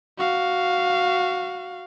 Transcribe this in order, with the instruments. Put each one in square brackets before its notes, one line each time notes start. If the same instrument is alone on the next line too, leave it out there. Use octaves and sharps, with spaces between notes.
[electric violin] F#4 F5